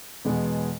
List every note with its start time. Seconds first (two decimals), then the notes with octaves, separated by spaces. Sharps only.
0.25 E2 B2 G#3 B3